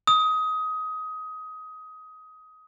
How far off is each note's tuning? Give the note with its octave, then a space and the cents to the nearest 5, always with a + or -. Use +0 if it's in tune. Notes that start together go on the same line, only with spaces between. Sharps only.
D#6 +20